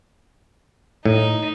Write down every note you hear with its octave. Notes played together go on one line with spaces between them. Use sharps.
A2 D#4